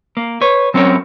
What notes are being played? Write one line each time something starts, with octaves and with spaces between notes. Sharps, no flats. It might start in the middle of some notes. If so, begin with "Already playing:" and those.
A#3
B4 C#5
F#3 C4 C#4 A#4 C#5